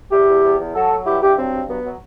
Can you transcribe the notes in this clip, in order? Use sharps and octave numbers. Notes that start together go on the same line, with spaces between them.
E2 E4 G4
E2
E2
E2
F#3 F#4 A4
F#3
G2 E4 G4
G2 E4 G4
F#3 C4
G2
F#3 B3
F#3